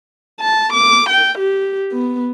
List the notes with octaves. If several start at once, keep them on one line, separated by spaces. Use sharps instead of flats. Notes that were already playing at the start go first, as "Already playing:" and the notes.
A5
D6
G5
G4
B3